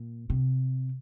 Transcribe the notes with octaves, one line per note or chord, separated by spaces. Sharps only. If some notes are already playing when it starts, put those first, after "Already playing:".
Already playing: A#2
C3